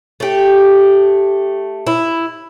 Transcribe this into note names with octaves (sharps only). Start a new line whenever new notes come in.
A3 G4
E4